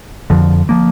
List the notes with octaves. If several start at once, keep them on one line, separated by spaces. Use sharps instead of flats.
F2 D3 F3
F3 A#3